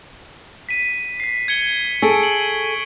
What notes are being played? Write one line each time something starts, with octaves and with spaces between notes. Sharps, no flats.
B6 D#7
B6 C7
G#6 C#7 G7
G#4 A4 C#6 D7
F#7